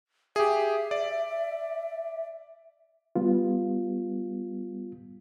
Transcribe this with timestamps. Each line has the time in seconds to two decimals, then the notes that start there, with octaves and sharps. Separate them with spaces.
0.36 G4 G#4 E5
0.91 D5
3.15 G3 B3 F4